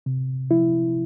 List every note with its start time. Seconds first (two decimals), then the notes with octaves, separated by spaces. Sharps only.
0.06 C3
0.51 F3 E4